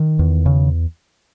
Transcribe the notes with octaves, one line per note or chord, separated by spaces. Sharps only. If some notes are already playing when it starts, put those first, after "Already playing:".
Already playing: D#3
E2
C#3